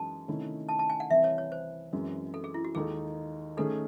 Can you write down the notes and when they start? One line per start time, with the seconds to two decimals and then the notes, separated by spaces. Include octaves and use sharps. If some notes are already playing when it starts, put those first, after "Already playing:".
Already playing: F#2 E3 G#3 D#4 A5
0.28 C3 D#3 A3 C#4 E4
0.69 A5
0.79 A5
0.90 G#5
1.00 F#5
1.10 C2 C3 E3 E5
1.24 C#5
1.38 C#5
1.52 C5
1.93 F#2 E3 G#3 C4
2.34 A4
2.44 G#4
2.54 E4
2.65 F#4
2.75 D#2 D#3 G#3 D#4 G#4 A4
3.57 D#3 A3 C#4 G#4 A4